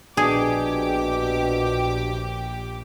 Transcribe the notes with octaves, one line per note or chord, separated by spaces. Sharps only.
A#1 B2 D4 G4 G#4 D6